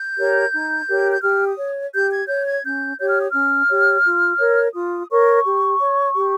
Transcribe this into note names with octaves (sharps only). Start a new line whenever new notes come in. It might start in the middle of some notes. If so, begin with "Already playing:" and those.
Already playing: G6
G4 A#4 C#5
D#4
G4 A#4 C#5
G6
G4 F6
D#6
C#5
G4 G6
G#6
C#5 G6
G#6
C#4 G6
G4 C#5 G6
F6
D#6
C#4 F6
G4 C#5
F4
A#4 C#5
F4 D#6
A#4 C#5 C#6
G4
C#5
G4